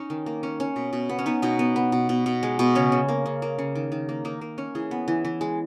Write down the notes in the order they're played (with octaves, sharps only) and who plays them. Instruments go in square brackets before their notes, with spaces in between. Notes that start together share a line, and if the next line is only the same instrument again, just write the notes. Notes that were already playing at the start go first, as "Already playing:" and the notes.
Already playing: [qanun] C#4 D#4
D#3
A#3
C#4
C#4
B2
B2
B3
C#4
B3 D#4
B2 D#4
B3
B3
B2
B2
B2
G#3
B2
C#3 C#4
C#3
A#3
C#3
A#3
C#3
D#3
D#3
A#3
A#3 D#4
A#3
C#4
E3 G#4
B3
E3
E3
G#3